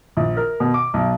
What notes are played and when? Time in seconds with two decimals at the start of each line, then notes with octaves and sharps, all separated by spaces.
0.17 A#1
0.37 A#4
0.60 B2
0.74 D6
0.94 B1